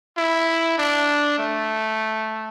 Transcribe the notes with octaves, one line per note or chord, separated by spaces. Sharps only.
E4
D4
A3